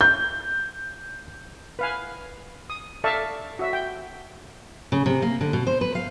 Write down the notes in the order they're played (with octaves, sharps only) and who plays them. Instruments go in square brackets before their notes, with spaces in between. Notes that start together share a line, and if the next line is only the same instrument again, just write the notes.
[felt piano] G6
[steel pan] B4 F5 G#5
D#6
A4 D5 E5 F5 A5 C#6
F#4 E5
G5
[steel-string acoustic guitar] C#3
C3
A#3
D3
B2
C5
B4
F5